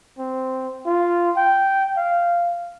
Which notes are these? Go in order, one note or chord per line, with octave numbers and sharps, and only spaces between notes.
C4
F4
G5
F5